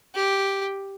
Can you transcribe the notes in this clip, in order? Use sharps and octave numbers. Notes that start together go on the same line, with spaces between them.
G4